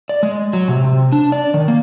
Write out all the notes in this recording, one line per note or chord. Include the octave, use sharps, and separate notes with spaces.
D5
G#3
F#3
C3
C3
D4
D5
D#3
A#3